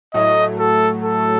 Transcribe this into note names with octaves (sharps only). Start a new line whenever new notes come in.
A2 F#3 A3 D#5
A4
A4